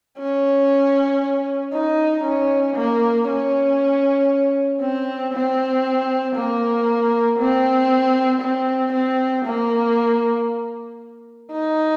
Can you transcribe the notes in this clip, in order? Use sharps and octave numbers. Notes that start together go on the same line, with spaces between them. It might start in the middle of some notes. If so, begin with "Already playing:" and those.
C#4
D#4
C#4
A#3
C#4
C4
C4
A#3
C4
C4
C4
A#3
D#4